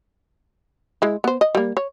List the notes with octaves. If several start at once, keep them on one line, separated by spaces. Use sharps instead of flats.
G#3 E4
B3 C5
D#5
G3 A#3
C#5